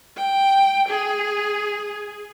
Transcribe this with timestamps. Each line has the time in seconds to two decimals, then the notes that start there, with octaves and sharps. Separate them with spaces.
0.17 G5
0.88 G#4